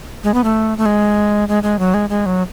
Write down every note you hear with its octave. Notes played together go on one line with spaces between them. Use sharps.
G#3
B3
A3
A3
G#3
G#3
G#3
F#3
G#3
G#3
F#3